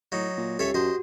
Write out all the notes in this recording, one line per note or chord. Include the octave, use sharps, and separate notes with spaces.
A2 F#3 D#4
A#2
C#2 G4 A4 C#5 E5
F#2 F#4 C5 D#5